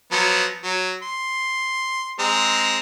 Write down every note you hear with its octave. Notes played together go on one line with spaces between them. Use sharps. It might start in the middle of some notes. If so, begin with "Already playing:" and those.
F3 F#3 B3
F#3
C6
G#3 C4 A#5